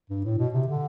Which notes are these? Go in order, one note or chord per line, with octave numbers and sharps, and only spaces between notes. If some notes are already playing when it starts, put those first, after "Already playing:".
G2
A2
B2
C3
D3